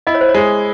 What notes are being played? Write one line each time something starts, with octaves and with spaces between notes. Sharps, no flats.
E4 D#5
C#5
C5
C#5
G#3